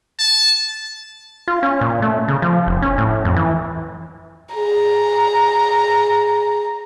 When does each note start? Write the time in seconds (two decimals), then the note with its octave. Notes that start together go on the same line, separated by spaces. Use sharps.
0.19 A5
1.48 F4
1.63 C#4
1.81 A#2
2.02 A3
2.28 C#3
2.42 F3
2.66 F1
2.82 C#4
2.98 A2
3.25 F2
3.36 E3
4.55 G#4 A#5